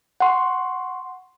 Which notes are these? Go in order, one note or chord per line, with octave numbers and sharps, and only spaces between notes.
F#5 C6 C#6